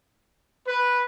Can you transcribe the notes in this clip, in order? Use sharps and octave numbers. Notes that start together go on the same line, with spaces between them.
B4